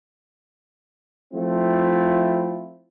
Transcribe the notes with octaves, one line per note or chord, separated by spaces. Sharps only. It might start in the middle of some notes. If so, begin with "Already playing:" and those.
F3 A3 C4 E4 F4